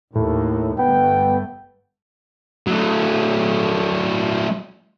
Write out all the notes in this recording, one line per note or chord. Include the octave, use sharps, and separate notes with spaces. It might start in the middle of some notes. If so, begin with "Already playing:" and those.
D#2 A2
G1 A3 B3 G5
F#3 A3